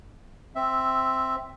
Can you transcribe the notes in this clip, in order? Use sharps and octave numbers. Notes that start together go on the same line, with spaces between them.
C4 E5